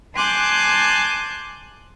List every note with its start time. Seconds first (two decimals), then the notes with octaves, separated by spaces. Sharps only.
0.15 G#5 A5 C6 D6 F#6 G6